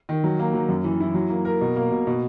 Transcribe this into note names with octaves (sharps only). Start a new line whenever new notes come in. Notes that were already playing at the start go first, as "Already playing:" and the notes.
D#3
F#3
A#3
F#3
F#2
E3
E4
F#3
A#3
A#4
B2
A#3
B2
B2